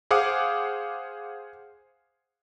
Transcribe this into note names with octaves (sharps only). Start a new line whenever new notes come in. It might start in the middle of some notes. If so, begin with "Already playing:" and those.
G#4 C5 F5 F#5 D6 D#6